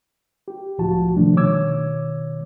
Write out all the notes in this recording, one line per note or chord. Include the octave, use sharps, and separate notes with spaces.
G4
C#2 A2 F3 F4 F#4 A5
C3 D#3 F3 G3 A3 D4
B2 D#3 C#5 D6 E6 G#6